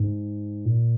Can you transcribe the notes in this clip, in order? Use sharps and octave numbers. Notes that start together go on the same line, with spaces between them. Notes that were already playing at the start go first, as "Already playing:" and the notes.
Already playing: G#2
A#2